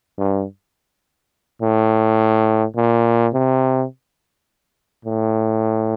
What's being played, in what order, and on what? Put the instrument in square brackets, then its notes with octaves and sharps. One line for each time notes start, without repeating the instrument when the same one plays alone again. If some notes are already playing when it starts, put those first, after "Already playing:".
[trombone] G2
A2
A#2
C3
A2